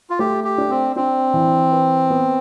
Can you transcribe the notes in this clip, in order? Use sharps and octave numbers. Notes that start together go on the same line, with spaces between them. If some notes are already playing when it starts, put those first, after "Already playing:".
F4
A3 G4
G4
D4
C4
C4 D4
E3
B4
B3